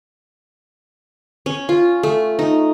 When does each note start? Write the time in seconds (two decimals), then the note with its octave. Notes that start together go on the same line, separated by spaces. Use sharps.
1.46 C#4
1.69 F4
2.03 A3
2.39 D#4